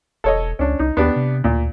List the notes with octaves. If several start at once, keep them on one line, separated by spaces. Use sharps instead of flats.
E1 A4 C#5 D#5
C#2 C#4 D4
C2 D#4
D#2 B3 D4 G4
C3
D2 A#2